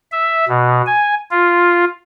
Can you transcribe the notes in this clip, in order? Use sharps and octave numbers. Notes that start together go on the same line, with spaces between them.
E5
B2
G#5
F4